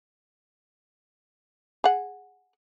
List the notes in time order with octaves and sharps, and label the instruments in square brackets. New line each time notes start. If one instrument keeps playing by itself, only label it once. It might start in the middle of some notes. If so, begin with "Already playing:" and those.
[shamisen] G#4 F#5